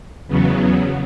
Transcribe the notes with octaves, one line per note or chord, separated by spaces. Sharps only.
E2 C#3 F#3 B3